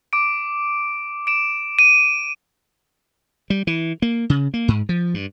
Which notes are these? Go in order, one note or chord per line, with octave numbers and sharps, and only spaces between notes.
D6 D7
D7 E7
D#7
G3
E3
A#3
C#3
A#3
G#2
F3
G2